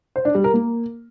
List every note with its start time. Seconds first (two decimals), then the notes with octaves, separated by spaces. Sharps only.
0.16 C5
0.25 D4
0.35 G3
0.44 A#4
0.54 A#3